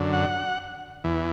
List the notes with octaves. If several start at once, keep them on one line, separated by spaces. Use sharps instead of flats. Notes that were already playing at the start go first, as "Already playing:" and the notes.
Already playing: F#2 D3
F#5
E2 E3